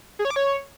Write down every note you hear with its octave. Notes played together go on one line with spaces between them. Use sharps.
G#4
C#5
D6
C#5